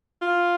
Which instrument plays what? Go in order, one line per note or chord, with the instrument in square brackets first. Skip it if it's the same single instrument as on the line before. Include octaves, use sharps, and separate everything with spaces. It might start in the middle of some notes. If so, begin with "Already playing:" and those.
[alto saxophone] F4